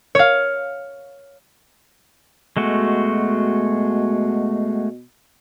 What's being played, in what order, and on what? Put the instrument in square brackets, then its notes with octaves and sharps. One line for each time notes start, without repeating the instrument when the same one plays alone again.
[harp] C#5 F5
[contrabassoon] B2 [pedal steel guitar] G#3 A3 F#4